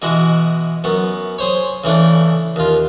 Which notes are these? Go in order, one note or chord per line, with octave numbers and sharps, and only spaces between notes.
B2 E3 G#3 F#4
F#2 B3 C#6
G#4 C5 C#5
C#3 E3 A3 D4
D#2 F4